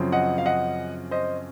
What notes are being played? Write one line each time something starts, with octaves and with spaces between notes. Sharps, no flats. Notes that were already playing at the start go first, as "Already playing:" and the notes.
Already playing: F#2 C#3 F3 C4
D#5 F#5
F5
D#5 F#5
C5 D#5